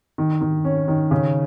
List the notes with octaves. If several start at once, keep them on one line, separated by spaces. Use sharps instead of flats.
D#3
D#3
C#4
D#3
C#3